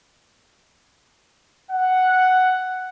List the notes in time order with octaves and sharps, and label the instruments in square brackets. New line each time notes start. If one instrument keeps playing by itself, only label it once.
[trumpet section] F#5